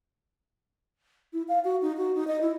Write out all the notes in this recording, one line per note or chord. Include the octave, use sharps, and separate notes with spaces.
E4
F5
F#4
D#4
F#4
D#4
D#5
E4